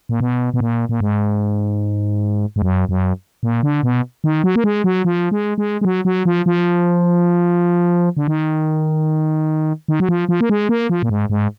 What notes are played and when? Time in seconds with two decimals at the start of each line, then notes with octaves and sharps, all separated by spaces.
0.09 A#2
0.20 B2
0.54 B2
0.61 A#2
0.89 A#2
1.01 G#2
2.56 G#2
2.62 F#2
2.89 F#2
3.43 A#2
3.63 D3
3.83 B2
4.24 D#3
4.44 F#3
4.56 A#3
4.64 G#3
4.84 F#3
5.05 F3
5.31 G#3
5.58 G#3
5.81 G#3
5.85 F#3
6.05 F#3
6.25 F3
6.46 F3
8.17 D3
8.28 D#3
9.88 D#3
10.00 F#3
10.09 F3
10.29 F3
10.41 A#3
10.49 G#3
10.69 A#3
10.90 F3
11.02 A#2
11.09 G#2
11.30 G#2